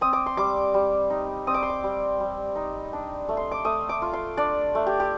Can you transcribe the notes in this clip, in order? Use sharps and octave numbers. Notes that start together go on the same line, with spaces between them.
C4 D#6
D6
C6
G3 D6
G3
D#4
C4 D#6
D6
C6
D6
G3
G3
D#4
D4
A3
C6
D6
A3 D#6
D6
F4
C6
D4 D5
A3
G4
G4